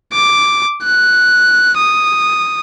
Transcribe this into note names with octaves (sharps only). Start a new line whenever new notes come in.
D6
F#6
D#6